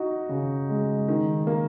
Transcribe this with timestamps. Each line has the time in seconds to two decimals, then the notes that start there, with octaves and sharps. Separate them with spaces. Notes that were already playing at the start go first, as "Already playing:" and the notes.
Already playing: D#4 F#4
0.29 C#3
0.69 G#3
1.08 D#3
1.47 A#3